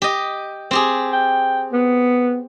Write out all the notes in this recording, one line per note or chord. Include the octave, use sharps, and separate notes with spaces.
G4 D#5
C4 G4 G#4
G5
B3